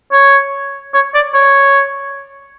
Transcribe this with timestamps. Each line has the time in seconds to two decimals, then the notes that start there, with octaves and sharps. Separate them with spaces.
0.13 C#5
0.94 C#5
1.15 D5
1.34 C#5